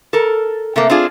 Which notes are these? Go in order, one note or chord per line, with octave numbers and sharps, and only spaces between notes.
A4 A#4
C3 A3 A#3
C4 D4 F4 G#4